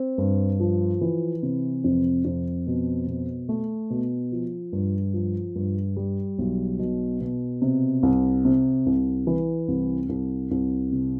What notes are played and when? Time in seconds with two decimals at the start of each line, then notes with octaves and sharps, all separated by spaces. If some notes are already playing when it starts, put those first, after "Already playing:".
Already playing: C4
0.18 G2
0.60 F3
1.01 E3
1.43 C3
1.84 F2
2.25 F2
2.67 B2
3.07 B2
3.49 A3
3.90 B2
4.32 F3
4.73 G2
5.14 F3
5.56 G2
5.97 G3
6.39 B1
6.79 B2
7.21 B2
7.62 C3
8.03 C2
8.45 C3
8.86 C2
9.27 E3
9.68 C2
10.09 C2
10.51 C2
10.92 C3